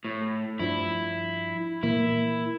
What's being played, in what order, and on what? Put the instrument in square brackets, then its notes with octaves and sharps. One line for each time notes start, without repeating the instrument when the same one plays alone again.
[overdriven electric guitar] A2
[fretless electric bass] G2 F3 D4 [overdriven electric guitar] E4
[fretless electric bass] A#2 E3 A#3 [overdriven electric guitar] E4